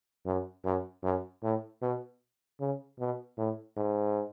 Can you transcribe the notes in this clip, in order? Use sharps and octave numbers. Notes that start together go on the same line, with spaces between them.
F#2
F#2
F#2
A2
B2
C#3
B2
A2
G#2